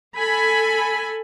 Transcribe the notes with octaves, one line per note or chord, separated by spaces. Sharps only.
A4 G#5 B5